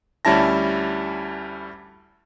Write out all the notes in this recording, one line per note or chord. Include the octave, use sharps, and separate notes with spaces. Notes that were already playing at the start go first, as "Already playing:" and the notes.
D2 G3 C#4 E4 A5 A#6